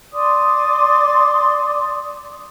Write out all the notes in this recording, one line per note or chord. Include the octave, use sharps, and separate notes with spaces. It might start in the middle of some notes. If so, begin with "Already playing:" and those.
D5 C6 D6 D#6